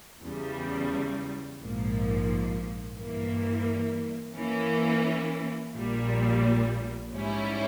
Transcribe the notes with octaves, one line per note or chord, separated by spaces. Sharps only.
E2 C#3 G3
A#1 G#2 F3 A#3
G2 E3 A#3
E3 A#3 C#4
A#1 A#2 G3
G#2 G3 C#4 E4